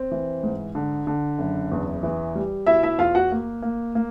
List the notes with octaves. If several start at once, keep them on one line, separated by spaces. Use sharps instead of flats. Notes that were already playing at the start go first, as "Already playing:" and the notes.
Already playing: C4
E3
G#2
D3
D3
F#1
E2
E3
G3
B2 E4 E5
E4 E5
E2 F4 F5
F#4 F#5
A#3
A#3
A#3